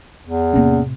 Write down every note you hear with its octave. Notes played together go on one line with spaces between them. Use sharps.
E2
A2 C3 A#3 C#4